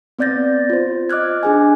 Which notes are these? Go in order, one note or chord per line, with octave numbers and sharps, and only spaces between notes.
B3 C4 D5 G6 A6 A#6
F4 C5
D#5 D6 F6 F#6 G#6
D4 G#4 G#5